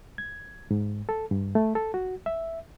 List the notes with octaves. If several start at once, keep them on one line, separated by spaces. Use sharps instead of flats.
G#6
G#2
A4
G2
A3
A4
F#4
E5